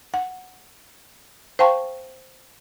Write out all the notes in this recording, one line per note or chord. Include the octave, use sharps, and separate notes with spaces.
F#5
C5 F5 G5 A5 C6 C#6